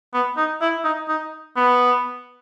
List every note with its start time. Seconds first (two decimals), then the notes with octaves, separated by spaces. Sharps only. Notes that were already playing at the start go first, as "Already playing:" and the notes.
0.14 B3
0.37 D#4
0.61 E4
0.85 D#4
1.09 D#4
1.56 B3